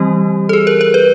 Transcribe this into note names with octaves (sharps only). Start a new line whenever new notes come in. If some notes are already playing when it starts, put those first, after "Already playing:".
Already playing: E3 G3 C4 G4
A4
G#4
A#4
A#4
B4